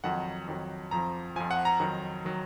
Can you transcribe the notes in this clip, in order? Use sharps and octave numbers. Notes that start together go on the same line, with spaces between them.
F2 D#3 F#3 F#5
F2 D#3 F#3
F2 F3 A#5
F2 F3 G#5
F#5
A#5
F2 D#3 F#3
D#3 F#3